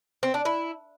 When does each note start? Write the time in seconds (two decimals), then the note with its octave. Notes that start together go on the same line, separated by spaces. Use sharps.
0.23 C4
0.34 D4
0.45 E4